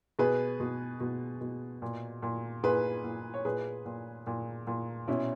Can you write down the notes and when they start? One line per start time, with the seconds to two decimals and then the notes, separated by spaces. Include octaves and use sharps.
0.19 B2 G#4 B4
0.60 B2
1.00 B2
1.41 B2
1.82 A#2
2.22 A#2
2.63 A#2 G#4 B4
3.04 A#2
3.34 C#5
3.45 A#2 G#4 B4
3.85 A#2
4.27 A#2
4.67 A#2
5.08 B2 C#4 E4